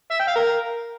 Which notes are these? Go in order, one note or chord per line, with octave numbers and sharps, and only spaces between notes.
E5
G5
F5
A#4